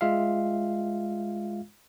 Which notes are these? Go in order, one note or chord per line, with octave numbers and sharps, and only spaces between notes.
G#3 F4 E5 F5